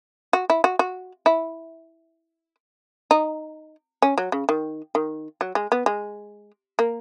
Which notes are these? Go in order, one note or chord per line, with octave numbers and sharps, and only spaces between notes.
F#4
E4
F#4
F#4
E4
D#4
C#4
F#3
C#3
D#3
D#3
F#3
G#3
B3
G#3
A#3